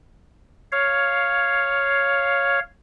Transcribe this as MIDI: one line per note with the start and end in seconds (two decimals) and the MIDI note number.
0.72 2.59 73
0.72 2.59 77